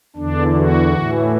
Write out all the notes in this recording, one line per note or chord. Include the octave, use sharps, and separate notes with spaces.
E2 D3 D4
F#4
A2 E3